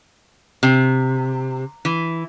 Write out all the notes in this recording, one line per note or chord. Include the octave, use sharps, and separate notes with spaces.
C3
E3